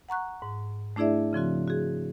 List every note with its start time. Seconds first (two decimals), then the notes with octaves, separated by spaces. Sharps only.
0.09 F#5 A#5 C#6 F#6
0.42 G#2
0.96 A3 D4 E4 G#4 D5 E5
1.33 C#3 F3 C4 F#4
1.68 F#4 G#4